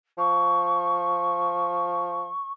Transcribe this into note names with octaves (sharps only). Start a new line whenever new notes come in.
F3 C#6